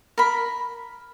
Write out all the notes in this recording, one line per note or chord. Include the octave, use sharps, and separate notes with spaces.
A#4 B5